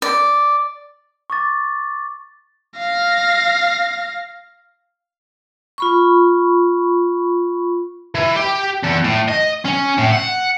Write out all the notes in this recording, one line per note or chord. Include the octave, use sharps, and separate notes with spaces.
D5
C#6 D6 A6
F5 A#6
F4 B5 C#6
E3
G4
E2
A2
D#5
C#4
A2
F#5